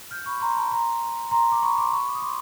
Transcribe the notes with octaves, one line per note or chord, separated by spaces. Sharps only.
F6 G6
B5 C#6
A#5 C6
A5 B5
A#5 C6
A#5 C6
D6
B5 C#6
C6 D6
B5 C#6
D6
D#6
C6 D6